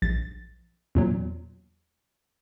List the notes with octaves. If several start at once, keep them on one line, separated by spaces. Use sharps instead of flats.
A#1 A6
E2 A#2 F#3